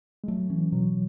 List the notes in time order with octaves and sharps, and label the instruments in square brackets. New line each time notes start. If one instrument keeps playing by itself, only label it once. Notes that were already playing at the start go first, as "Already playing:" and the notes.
[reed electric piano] G#3
[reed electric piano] F#3 [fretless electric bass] A3
[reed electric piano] E3 [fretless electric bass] C#4
[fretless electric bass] B2 [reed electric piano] F#3